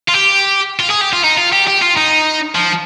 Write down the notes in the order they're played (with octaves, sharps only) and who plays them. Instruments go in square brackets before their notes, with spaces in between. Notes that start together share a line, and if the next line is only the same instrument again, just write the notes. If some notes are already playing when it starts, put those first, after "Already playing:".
[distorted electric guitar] F4
G4
F4
G#4
G4
F4
D#4
F4
G4
G4
F4
D#4
F3